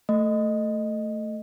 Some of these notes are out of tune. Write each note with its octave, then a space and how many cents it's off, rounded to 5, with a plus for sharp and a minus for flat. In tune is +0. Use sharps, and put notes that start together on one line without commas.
A3 +10 D#5 -10